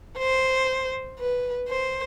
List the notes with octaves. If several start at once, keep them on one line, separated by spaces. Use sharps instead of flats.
C5
B4
C5